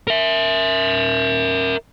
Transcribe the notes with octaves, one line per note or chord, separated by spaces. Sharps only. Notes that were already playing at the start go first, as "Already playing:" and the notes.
A#4 E5